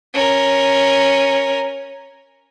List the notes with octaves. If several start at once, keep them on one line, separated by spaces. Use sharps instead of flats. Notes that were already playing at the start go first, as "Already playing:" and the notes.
C#4 A#4